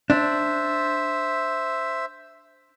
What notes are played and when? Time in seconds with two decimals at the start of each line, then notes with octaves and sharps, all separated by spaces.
0.10 D4 C5 E5